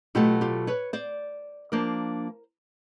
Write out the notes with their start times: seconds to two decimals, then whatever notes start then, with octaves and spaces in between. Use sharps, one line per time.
0.15 B2 F#3 A3 F4 G4
0.41 F4 G4
0.67 B4 C#5
0.93 C5 D5
1.72 F3 A#3 D4 A#4 C5